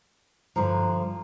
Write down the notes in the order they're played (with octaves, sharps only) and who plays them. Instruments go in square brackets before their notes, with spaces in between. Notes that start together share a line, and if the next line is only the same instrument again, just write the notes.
[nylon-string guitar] G2 D3 F3 [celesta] A#5